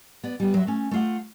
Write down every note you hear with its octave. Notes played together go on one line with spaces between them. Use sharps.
B3 D5
G3 B3
F#3 E5
A3 C#4
A3 F4 F#5